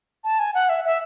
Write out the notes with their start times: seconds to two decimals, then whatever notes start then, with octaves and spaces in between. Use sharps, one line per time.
0.24 A5
0.39 G#5
0.54 F#5
0.69 E5
0.85 E5